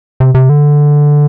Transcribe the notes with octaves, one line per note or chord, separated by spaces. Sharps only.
C3
C3
D3